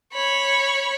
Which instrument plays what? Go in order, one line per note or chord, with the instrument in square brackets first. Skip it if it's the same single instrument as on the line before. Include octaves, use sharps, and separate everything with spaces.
[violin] C#5 B5